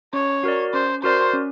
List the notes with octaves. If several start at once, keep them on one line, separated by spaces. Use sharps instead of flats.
C#4 C#5
F#4 A#4 D5
C#4 C5
F#4 A#4 C5 D5
C#4